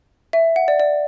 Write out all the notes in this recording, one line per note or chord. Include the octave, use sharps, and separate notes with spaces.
E5
F#5
D5
D5